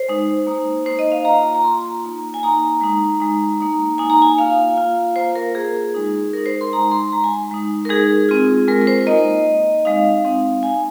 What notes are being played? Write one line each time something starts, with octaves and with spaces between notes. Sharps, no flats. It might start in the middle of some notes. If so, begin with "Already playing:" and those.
Already playing: C5
G#3 D#4
A#3 D#4
A#3 D#4 C5
D#5
F5
A#3 F4 A#5
A#5
A#3 F4 C6
A#3 D#4
G#5
A#3 D#4 A#5
G#3 D#4
G#3 D#4
A#3 D#4
A#3 D#4 G#5
A#5
G#5
A#3 F4 F5
A#3 F4
A#3 F4 C5
A#4
A#3 F4 G#4
G#3 D#4
G#3 D#4 A#4
C5
C6
G#3 D#4 A#5
C6
G#3 D#4 A#5
G#5
G#3 D#4
A#4
G#3 D#4 G#4
G#3 C4 F4
G#3 C4 F4 A#4
A#4
C5
A#3 D#4 D#5
A#3 D#4
G#3 C4 D#4 F5
G#3 C4 D#4
A#3 D#4 G#5